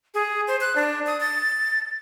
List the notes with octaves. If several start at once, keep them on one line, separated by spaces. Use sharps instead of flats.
G#4
C5
F#6
D4
D#6
A6